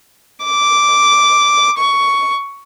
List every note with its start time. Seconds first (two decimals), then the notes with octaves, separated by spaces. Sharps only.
0.44 D6
1.78 C#6